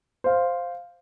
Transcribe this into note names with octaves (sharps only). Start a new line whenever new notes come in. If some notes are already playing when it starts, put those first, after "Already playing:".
C5 F5